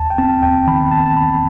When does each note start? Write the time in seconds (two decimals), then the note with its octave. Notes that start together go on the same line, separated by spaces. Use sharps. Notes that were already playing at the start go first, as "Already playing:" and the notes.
Already playing: D#2 A5
0.10 G5
0.18 C4 A5
0.43 D#2 G5
0.67 D#3 B5
0.91 D#2 A5
1.06 A5
1.16 D#2 B5